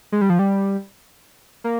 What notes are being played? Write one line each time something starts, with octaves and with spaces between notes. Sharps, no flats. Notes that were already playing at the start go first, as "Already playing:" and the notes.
G#3
G3
F3
G3
A#3